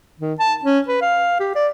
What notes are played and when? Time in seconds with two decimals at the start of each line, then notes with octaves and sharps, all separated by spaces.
0.20 D#3
0.40 A5
0.64 C#4
0.88 B4
1.02 F5
1.39 G4
1.55 D5